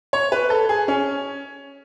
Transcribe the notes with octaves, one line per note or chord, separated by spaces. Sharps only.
C#5
B4
A4
G#4
C#4